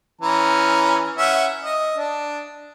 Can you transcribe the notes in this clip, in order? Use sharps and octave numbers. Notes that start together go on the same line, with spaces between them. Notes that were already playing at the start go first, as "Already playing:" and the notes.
E3 C#4 A#5
C#4 E5 F#5
D#5
D4